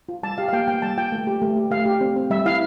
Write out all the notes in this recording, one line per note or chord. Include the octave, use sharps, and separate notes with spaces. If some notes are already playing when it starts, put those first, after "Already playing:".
F4
G3 A5
G4 F5
F5
A#3 G5
A#3 G5
G3 A5
F4 G5
A3
G4
A3
G4
A3 F5
G4
C4
C4
G3 E5
E4 F5